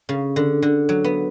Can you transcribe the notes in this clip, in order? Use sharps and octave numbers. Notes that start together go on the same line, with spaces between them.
C#3
D3
D3
F#3
B3